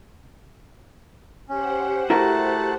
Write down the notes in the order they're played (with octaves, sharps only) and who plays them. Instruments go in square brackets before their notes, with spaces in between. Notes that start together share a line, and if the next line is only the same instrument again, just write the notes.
[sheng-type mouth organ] C#4 [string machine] G4 C5 F#5
[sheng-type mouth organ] A3 A5 F#6 [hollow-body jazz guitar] E4 F#4 A#4